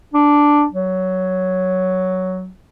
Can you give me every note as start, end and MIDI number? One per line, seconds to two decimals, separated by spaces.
0.14 0.65 62
0.73 2.50 54